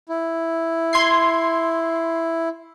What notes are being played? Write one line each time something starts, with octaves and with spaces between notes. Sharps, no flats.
E4
C6 G#6 C7